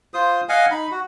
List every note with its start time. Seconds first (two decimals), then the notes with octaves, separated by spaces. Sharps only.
0.14 F4 C5 D#6
0.49 D#5 F5 F#5 G#5
0.71 D#4 B5
0.91 F#4